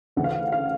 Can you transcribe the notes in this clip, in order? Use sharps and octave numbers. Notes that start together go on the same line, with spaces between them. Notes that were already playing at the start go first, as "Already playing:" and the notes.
D2 C#3 E3 F#5
F5
F#5
F5